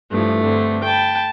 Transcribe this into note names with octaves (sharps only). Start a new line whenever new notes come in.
G2 E3 F3 A3
G2 D3 C4
G5 A5 B5